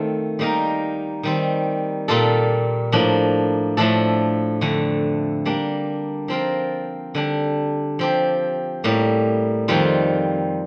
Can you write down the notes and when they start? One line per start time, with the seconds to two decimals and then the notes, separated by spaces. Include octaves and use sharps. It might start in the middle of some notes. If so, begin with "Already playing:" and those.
Already playing: D#3 A3 C4 F4
0.39 G3 A#3 D#4 A#4
1.23 D#3 G3 C4
2.08 A#2 G3 A#3 F4 A4
2.92 A2 F3 A#3 D4
3.77 A2 F3 A3 D4 A4
4.61 F2 D3 A3
5.46 G3 A#3 D4
6.28 F3 C4 F4 A#4
7.15 D3 G3 D4
7.99 F3 C4 G4
8.84 A2 G3 A#3
9.68 F2 D#3 G3 C4 F4